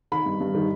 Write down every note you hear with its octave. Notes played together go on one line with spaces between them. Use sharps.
D#3 B5
G2
G2
D#3